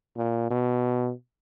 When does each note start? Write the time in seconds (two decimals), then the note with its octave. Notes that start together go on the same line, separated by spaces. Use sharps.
0.17 A#2
0.51 B2